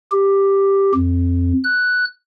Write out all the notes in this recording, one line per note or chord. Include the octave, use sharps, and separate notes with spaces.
G4
F2
F#6